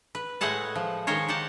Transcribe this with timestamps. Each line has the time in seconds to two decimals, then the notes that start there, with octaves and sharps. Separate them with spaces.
0.15 B4
0.41 A2 G#3 A3 G#4 F#5 A5
0.75 F3
1.07 D#3 F3 G#3 A#4 C5 C#5
1.29 G4 F#5 A5